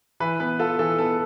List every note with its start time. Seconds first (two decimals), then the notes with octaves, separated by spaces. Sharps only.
0.20 E3 B4
0.40 B3 B4
0.59 F4 A4
0.79 E3 A4
0.99 B3 A4